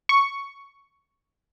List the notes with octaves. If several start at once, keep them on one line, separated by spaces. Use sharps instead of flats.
C#6